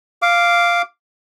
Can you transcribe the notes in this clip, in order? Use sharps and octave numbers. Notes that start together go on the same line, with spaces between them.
F5 D6